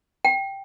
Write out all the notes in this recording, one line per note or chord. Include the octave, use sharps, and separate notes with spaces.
G5